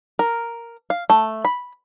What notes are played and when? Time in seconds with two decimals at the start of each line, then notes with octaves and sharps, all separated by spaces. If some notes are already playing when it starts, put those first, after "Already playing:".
0.19 A#4
0.90 F5
1.10 A3
1.45 B5